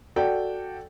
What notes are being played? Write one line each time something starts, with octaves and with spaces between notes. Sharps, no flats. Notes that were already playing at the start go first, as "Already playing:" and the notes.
F#4 A4 D5 G5